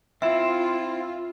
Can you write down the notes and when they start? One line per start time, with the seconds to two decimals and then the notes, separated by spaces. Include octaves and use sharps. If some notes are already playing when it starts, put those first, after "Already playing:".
0.22 C4 E4 F4 E5